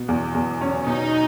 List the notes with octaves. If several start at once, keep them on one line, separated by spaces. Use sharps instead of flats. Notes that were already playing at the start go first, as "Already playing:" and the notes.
Already playing: B2
E2
E2
C#4
B2 D#4